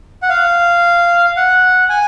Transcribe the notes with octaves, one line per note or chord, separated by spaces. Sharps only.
F#5
F5
F#5
G#5